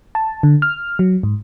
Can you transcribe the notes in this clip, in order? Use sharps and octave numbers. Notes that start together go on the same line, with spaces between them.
A5
D3
F6
F#3
G#2